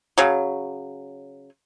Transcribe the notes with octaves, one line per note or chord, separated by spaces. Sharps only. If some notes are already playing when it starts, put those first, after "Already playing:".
C#3 F#3